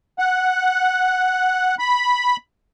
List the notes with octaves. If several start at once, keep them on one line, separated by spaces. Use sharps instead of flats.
F#5
B5